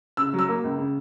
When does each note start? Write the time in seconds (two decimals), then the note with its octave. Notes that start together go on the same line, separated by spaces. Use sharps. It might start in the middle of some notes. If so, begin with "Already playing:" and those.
0.17 C#3 E6
0.34 F#3
0.39 E6
0.49 A#3
0.64 C#2
0.78 C#3